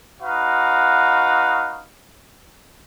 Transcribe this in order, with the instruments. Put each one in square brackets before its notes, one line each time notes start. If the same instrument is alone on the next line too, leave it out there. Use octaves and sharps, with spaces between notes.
[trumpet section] D#4 F#4 B4 F5